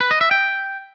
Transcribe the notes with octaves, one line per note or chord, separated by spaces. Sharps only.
B4
D#5
E5
G5